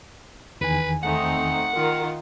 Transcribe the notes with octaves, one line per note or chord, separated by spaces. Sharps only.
E2 D#3 B4 G#5
A3 C4 D#4 F#5
D#3 F4 A#4